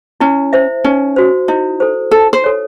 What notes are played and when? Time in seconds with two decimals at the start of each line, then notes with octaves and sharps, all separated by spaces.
0.20 C#4 E4
0.53 C5 E5
0.84 C#4 D#4
1.16 F#4 C5
1.48 D#4 E4
1.80 A4 C5
2.11 D#4 A4
2.33 C5
2.44 A4 C#5